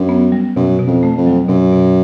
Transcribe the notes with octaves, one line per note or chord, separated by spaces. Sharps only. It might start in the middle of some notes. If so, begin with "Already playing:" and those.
Already playing: F#2 D4
B3
G3
F#2 B2
B2
F2
A3
F2
F#3
F#2 B2
B2